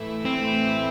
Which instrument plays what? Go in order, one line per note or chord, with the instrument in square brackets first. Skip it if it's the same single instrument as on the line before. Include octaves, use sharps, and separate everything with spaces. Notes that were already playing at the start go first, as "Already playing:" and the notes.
Already playing: [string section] A2 E3 A3 E4
[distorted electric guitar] C4